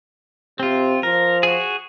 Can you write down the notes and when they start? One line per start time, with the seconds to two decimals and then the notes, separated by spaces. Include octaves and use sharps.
0.60 C3 C4 F4
1.03 F3 A#4
1.43 F#4 G#4